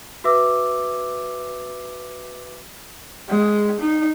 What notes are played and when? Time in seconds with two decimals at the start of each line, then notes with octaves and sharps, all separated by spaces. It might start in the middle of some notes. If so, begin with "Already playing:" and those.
0.24 F#4 B4 E5 D6 E6
3.29 G#3
3.80 D#4